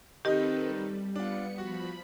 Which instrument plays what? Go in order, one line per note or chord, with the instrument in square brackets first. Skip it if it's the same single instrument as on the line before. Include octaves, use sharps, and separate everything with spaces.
[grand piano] D#3 D#4 [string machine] C4 A4 B4 [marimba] G4 D#5
[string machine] G3
[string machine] G3 B3 C#7 [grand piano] D4 F4
[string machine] F3 B5 [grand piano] F#4